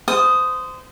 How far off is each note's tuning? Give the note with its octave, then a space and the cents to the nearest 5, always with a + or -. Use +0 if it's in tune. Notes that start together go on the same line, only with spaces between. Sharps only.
C5 -25 D#6 +0